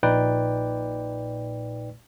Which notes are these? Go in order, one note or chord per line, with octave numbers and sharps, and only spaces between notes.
A#1 A#2 D#4 B4 D5 G5